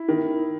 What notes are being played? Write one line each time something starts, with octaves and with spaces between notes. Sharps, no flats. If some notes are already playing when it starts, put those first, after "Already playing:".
Already playing: E4
D#3